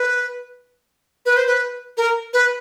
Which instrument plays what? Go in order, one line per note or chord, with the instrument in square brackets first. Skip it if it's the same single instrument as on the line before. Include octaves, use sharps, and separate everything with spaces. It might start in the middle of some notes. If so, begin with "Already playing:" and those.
Already playing: [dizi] B4
B4
C5
B4
A#4
B4